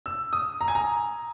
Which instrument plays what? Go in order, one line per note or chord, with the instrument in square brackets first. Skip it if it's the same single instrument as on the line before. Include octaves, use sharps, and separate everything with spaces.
[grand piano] E6
D#6
A#5
G#5
A#5